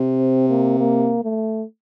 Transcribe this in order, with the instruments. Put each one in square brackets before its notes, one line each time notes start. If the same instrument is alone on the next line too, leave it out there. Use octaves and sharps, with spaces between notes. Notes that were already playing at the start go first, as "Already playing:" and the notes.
Already playing: [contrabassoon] C3
[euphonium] C4
A#3
A#3
A3